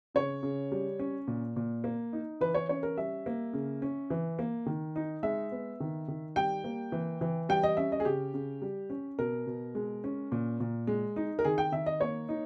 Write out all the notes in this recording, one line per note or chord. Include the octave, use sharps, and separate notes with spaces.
C#3 C#5
C#3
G3
C#4
A#2
A#2
A#3
D#4
E3 B4
C#5
C#4 C#5
A#4
G3 E5
A#3
C#3
C#4
E3
A#3
D#3
D#4
G#3 E5
B3
D#3
D#3
G3 G5
A#3
E3
E3
G3 G5
D#5
C#4 E5
D#5
G#4
C#3 G4
C#3
G3
C#4
B2 A#4
B2
G#3
C#4
A#2
A#2
G#3
D#4
A#4
D#3 G#4
G5
D#3 E5
D#5
A#3 C#5
D#4